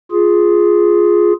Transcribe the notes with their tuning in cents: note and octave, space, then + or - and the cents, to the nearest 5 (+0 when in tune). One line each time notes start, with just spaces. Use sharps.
F4 +0 G#4 +0